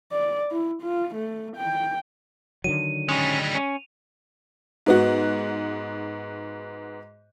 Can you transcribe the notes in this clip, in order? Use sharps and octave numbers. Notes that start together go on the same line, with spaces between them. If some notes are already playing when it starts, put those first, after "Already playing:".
D5
E4
F4
A3
G5
D3 D#3 F#3 D#7
G3 G#3 C#4 F7
C#4
G#2 B3 F#4